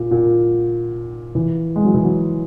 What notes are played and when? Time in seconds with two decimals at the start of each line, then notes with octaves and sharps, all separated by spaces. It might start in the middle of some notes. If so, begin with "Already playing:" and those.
Already playing: A#2
0.11 A#2
1.35 E3
1.76 G#3
1.85 F#3
1.94 E3
2.04 F#3